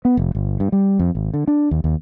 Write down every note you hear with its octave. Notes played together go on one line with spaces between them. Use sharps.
B3
F1
G1
G2
G3
F2
G#1
D3
D4
D#2
D#2